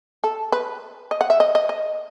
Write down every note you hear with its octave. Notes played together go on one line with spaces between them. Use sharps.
A4
B4
D#5
F#5
E5
D#5
D#5
D#5